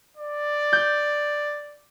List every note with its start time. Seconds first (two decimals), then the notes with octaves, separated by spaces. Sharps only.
0.17 D5
0.73 G6